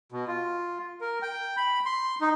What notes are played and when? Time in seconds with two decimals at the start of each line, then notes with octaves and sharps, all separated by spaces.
0.12 B2
0.28 F4
1.01 A#4
1.22 G5
1.57 B5
1.86 C6
2.21 D#4